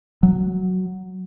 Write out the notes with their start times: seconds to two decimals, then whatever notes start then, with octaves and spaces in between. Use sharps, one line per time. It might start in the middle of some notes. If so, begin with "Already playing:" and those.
0.23 F#3